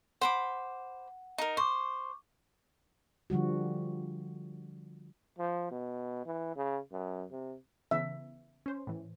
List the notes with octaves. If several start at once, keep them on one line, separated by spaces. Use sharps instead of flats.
C5 F#5 B5 D6
D#4 A#4
C5 C#6 D6
D3 F3 G3 F#4
F3
B2
E3
C#3
F#2
C3
C#3 E3 B3 E5
C#4 C5
A2 E3